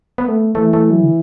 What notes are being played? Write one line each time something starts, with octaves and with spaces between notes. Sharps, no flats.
B3
A3
E3 A3
A3
F#3
D3